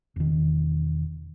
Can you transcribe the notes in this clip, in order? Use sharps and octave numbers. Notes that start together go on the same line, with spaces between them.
E1 D#3